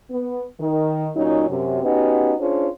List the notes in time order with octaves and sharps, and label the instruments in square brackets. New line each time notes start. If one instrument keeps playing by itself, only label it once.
[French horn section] B3
D#3
A#2 F#3 C#4 D#4
F#2 C3
B3 C#4 D#4 F#4 G4
C#4 D4 F4 G#4 C5